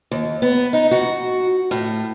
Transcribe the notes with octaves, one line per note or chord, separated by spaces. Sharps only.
D#2
B3
D#4
F#4
A2